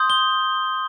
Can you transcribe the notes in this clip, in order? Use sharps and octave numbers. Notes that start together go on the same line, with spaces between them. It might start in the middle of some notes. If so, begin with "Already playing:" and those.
Already playing: C6 D#6 G6
G7